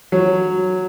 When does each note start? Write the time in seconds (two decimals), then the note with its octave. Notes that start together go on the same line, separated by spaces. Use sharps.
0.12 F#3